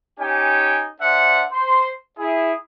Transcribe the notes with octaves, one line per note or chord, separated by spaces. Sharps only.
C#4 D#4 G4 G5 G#5
D4 C5 E5 F#5
C5 C6
E4 G#4